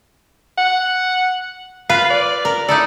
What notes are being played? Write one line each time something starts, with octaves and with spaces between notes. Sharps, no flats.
F#5
F4 B4 F5
D5
A#4
D#4 E4 A4 D5